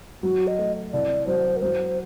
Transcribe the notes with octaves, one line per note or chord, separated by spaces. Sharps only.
F#3 F#4
D#5
A3
C2 D5
F#3 C5
A#4
F#3 C5